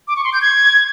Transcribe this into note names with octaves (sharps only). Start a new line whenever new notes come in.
D6
C#6
C6
G6
G#6